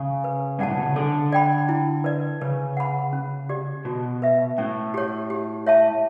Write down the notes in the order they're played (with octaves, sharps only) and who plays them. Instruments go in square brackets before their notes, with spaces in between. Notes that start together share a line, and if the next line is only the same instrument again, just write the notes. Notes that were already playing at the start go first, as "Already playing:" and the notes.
Already playing: [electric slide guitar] C#3
[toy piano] B4
[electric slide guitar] G2 [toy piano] D5 F#5 A5
[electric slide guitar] A2
B2
C#3
[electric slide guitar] D3 [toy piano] A4
[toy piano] D5 G5 B5
E4
B4 D5
[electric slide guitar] C#3 [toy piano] B4
[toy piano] F#5 B5
C#4
G4 D5
[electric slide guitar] B2 [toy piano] F#4
[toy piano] B4 E5
[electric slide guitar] A2 [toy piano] C#4
[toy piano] G4 C#5
G4
C#5 E5 A5